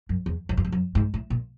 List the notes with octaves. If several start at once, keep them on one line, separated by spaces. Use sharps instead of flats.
F#2
E2
F2
F#2
F2
F#2
G#2
A2
A#2